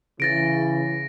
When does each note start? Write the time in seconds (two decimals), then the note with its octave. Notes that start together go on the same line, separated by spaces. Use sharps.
0.20 C#3 E3 A6 A#6 D7